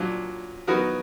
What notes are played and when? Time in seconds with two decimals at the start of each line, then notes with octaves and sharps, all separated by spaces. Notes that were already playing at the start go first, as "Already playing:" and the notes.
Already playing: A#2 F#3 D4
0.67 F#3 B3 D#4 F#4 A#4